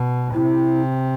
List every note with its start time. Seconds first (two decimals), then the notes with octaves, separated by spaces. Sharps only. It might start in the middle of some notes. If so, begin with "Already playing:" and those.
Already playing: B2
0.34 C3 E4